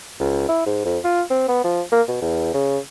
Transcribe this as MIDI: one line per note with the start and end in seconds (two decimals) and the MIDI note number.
0.20 0.46 37
0.49 0.62 64
0.66 0.83 44
0.85 0.98 41
1.04 1.22 65
1.30 1.46 60
1.48 1.63 59
1.64 1.81 53
1.92 2.02 58
2.08 2.18 47
2.22 2.50 40
2.54 2.78 49